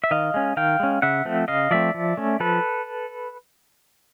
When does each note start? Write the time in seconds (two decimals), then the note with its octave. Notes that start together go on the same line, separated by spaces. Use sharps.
0.04 E5
0.11 D#3 D#5 F5
0.34 G#3 C#4
0.57 D#3 F5 G5
0.80 G#3 C#4
1.02 C#3 E5 F#5
1.25 F3 A3 C4
1.48 C#3 D#5 F5
1.71 F3 A3 C4 D5 E5
1.94 F3
2.17 A3 C#4
2.40 F3 A4 B4